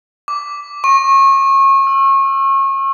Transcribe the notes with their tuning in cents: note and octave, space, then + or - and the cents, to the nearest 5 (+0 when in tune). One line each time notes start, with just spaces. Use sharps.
D6 -10
C#6 -30
E6 +15